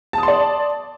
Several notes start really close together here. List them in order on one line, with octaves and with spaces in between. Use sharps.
A5 D#6 C6 D5